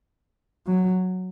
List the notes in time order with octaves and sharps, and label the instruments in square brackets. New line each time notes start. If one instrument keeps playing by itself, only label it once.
[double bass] F#3